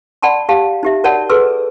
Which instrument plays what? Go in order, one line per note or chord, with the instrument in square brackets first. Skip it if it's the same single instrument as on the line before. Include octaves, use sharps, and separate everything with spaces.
[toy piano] D5 F#5 A5 B5 C6
G4 F5 A5
D#4 G4 E5
F#4 A#4 C#5 D5 F#5 A5
G#4 A4 B4 C6 E6